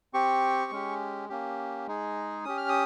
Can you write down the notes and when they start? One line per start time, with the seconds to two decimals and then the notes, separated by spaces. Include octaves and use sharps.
0.14 C4 G4 C#6
0.71 G#3 C#4 G4
1.29 A#3 C#4 G4
1.87 G#3 D#4 G#4
2.45 C#4 G4 D#6
2.57 F6
2.69 D#6